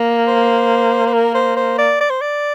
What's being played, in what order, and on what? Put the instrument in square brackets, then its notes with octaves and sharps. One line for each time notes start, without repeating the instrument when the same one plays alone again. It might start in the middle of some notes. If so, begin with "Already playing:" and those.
Already playing: [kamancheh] A#3
[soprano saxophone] C5
C5
A#4
C5
C5
D5
D5
C5
D5